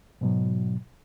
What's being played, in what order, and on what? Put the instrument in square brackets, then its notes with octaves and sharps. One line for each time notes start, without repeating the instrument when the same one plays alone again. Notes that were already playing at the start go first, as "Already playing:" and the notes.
[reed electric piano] G#2 B2 F#3